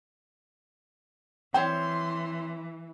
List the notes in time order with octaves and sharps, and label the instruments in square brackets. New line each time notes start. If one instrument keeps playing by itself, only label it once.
[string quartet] E3 [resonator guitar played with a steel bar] C4 C5 C#5 [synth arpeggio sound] G5 [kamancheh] C6